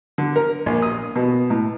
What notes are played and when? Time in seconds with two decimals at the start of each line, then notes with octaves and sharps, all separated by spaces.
0.18 D3
0.36 A#4
0.66 A#1
0.82 D#6
1.15 B2
1.50 A2